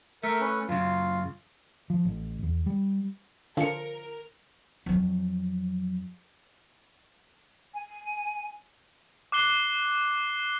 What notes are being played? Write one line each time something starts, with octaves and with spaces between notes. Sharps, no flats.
A3 A#4 E5
C#4 B4
F#2 C#3 F4
F3
A1
E2
G3
D3 F3 F4 A#4 C#5 C#7
F2 F#3
G#5
D6 F#6 C7 G7